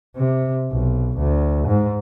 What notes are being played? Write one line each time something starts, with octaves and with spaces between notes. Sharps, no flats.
C3
B1
D2
G#2